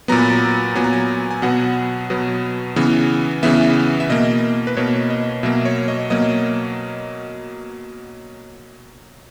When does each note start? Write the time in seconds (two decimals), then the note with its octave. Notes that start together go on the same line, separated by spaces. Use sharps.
0.08 A#2 F#3 B3 A#5
0.19 B5
0.30 A#5
0.75 A#2 F#3 B3 G#5
0.84 A#5
0.93 G#5
1.31 G#5
1.42 B2 F#3 B3 F#5
2.10 B2 F#3 B3
2.76 C#3 E3 B3
3.43 C#3 E3 B3 E5
4.00 E5
4.09 B2 A#3 D#5
4.67 B4
4.77 B2 A#3 C#5
5.10 D#5
5.43 B2 F#3 A#3 E5
5.65 C#5
5.88 D#5
6.10 B2 F#3 A#3 D#5